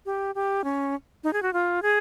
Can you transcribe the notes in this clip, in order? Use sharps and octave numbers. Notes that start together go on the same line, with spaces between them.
G4
G4
C#4
D#4
G#4
F#4
F4
G#4